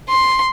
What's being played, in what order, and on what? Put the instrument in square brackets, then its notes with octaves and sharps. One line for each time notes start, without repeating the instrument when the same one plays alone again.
[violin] C6